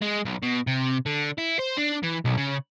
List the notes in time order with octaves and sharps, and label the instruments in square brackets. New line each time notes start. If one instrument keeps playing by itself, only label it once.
[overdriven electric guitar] G#3
B1
B2
C3
D3
E4
C5
D4
E3
B1
C#3